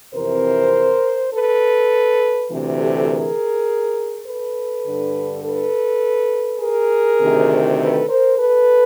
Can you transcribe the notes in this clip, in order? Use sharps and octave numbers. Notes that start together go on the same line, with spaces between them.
F2 C3 E3 A#4 C5
A4 B4
D2 C3 E3
G4 A4
G#4 A#4
A4 B4
G2 D3
A4 B4
G#4 A#4
D2 C3 D#3
A4 B4
A#4 C5
A4 B4